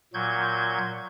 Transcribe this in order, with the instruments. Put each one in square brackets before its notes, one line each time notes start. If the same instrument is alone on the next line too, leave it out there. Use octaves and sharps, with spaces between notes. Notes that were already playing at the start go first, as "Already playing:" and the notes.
[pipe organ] A#2 F#3 G6 G#6